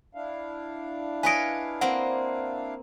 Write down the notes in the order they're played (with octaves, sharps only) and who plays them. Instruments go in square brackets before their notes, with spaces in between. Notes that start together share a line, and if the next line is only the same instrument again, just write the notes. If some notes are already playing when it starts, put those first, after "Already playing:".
[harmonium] D4 E4 F5
[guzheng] B4 C#5 D#5 [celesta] G#5 D7
[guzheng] A#3 C4 [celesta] F#5